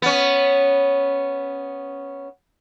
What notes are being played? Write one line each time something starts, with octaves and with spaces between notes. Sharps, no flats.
B3 C#4